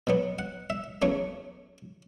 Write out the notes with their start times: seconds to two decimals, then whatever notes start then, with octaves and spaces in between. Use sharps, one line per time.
0.07 B2 F#3 B3
0.39 F#5
0.70 E5
1.02 E2 C#3 F#3 A3 C#5